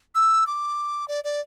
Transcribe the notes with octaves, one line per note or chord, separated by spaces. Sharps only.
E6
D6
D5
D5